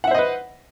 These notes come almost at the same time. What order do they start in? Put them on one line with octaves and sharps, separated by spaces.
F#5 E5 C5 D#5 B4